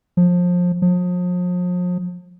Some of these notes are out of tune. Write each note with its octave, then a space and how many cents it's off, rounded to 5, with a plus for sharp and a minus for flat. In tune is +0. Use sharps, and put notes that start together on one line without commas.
F3 +25
F3 +40